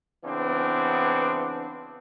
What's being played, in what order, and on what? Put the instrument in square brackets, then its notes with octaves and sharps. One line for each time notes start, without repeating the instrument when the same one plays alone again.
[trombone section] C#3 E3 B3 C4 D4